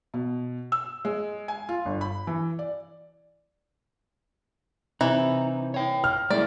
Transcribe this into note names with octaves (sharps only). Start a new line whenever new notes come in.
B2
E6
G#3
G#5
F4
G1
B5
E3
D5
C3 E3 D#4
C#5 G5
F6
G#3 A#3 E4 D5